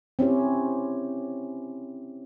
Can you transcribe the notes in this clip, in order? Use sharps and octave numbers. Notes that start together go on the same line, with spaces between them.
C4 C#4 E4 G4